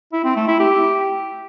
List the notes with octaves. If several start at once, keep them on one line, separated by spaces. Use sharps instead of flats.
E4
C4
A3
E4
G4